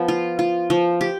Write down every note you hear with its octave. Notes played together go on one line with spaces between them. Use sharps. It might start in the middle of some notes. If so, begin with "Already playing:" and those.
Already playing: F3 B3
F4
F4
F3
G4